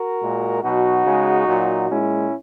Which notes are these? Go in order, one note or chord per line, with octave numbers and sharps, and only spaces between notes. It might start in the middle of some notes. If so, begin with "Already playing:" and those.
Already playing: F#4 A#4
A#2 G#3
B2 F#3 D#4 F#4
C#3 G#3
A#2 F#3
A#2 G#3 C#4 E4